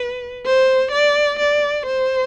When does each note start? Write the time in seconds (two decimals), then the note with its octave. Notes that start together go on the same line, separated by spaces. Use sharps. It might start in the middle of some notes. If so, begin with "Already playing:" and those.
Already playing: B4
0.46 C5
0.92 D5
1.39 D5
1.86 C5